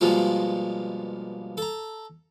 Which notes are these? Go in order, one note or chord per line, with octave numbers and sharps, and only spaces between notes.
G2 B2 F3 G#3 A#3 F4
A4 A#5